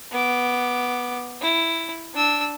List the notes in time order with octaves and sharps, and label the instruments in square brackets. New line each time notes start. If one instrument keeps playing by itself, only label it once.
[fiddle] B3 D6
E4
D4 E6